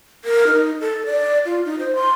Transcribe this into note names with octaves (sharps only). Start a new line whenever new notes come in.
A#4
D#4
A4
D5
F4
D#4
C5
C6